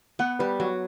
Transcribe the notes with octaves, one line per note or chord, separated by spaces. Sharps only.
B3 F#5
G3 B4
F#3 F#4